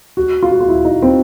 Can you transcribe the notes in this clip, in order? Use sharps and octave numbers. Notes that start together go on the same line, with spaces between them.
F#4
F4
F#4
F4
E4
D#4
C4